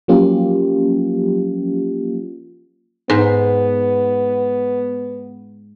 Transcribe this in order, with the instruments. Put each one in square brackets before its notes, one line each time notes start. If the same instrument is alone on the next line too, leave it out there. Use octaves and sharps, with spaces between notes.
[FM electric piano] F3 F#3 A#3 C#4 F4 G4
[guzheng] G#2 [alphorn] B3